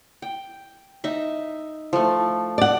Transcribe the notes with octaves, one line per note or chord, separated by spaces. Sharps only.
G5
D#4 E5
F3 A3
D5 F#5